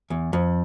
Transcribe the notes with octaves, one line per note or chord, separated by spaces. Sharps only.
E2
F2